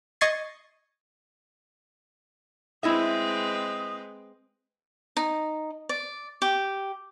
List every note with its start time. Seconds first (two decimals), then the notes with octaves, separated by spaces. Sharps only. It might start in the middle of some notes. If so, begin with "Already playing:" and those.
0.21 D#5 C#6 G#6 A6 C7
2.83 G#3 C4 E4 B4 D#5 E5 D#6
5.17 D#4
5.89 D5
6.42 G4